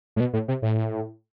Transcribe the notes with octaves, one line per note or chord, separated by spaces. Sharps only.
A2
B2
A2
C3
A2